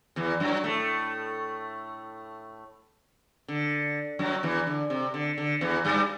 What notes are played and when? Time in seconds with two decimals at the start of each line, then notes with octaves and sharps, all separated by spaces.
0.16 E2 E3
0.40 F#2 F#3
0.64 A2 A3
3.48 D3
4.19 F#2 F#3
4.43 E2 E3
4.67 D3
4.90 C3
5.14 D3
5.38 D3
5.61 E2 E3
5.85 G2 G3